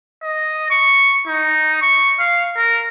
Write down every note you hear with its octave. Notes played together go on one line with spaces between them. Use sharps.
D#5
C#6
D#4
C#6
F5
A#4